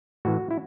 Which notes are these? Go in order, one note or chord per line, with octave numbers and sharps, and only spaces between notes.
A2 E3 F#4
E4